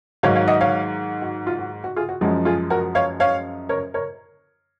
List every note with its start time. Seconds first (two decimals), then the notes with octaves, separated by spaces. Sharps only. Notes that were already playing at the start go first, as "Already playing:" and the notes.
0.23 G#2 D#3 F#3 C#5 F5
0.35 C#5 F5
0.48 D#5 F#5
0.61 C#5 F5
1.22 F#4
1.47 F4
1.59 F#4
1.84 F#4
1.96 F4 G#4
2.09 F#4
2.21 F#2 F3 G#3 F#4
2.45 F4 G#4
2.70 F#4 A#4
2.95 C#5 F5
3.20 C#5 F5
3.69 A#4 C#5
3.94 A#4 C#5